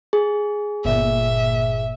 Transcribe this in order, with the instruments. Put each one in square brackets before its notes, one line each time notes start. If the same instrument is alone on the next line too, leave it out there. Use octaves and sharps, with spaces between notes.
[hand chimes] G#4
[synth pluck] G1 A#2 [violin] E5